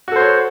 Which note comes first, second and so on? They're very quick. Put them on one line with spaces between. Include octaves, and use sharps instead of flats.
F#4 A4 C5 C#5